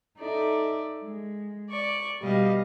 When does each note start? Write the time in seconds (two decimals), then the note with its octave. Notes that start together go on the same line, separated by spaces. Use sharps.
0.18 D#4 A4 D5 E5
1.02 G#3
1.68 D5 C#6
2.21 B2 G3 D#5 F5